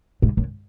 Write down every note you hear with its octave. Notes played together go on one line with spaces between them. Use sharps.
G#2
F#2